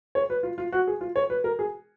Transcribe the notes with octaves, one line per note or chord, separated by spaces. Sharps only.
C#5
B4
F4
F4
F#4
G#4
F4
C#5
B4
A#4
G#4